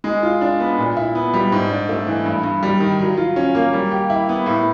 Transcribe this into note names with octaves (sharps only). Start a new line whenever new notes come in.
G#3
F4
D4
B3
A#2
E4
B3
G3
G#2
D4
A3
E3
G2
G2
G3
D#3
F#3
F4
C#4
A#3
G3
G4
E4
B3
A2